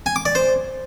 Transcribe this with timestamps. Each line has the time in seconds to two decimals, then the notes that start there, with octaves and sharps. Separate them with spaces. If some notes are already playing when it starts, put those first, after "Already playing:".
0.06 G#5
0.16 D6
0.25 D5
0.35 C5